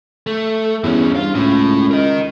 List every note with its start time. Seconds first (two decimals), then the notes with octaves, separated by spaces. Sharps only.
0.27 A3
0.84 E2 G2 C#4
1.16 G2 F4 F5
1.35 C#2 A2
1.91 A#4 D#5